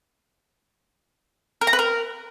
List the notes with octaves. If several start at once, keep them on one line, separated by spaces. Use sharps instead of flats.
A#4
A#5
B4
A#4